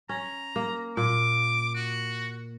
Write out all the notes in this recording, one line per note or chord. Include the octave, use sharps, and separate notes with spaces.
C#4 A#5
A#3
A#2 D6
F#4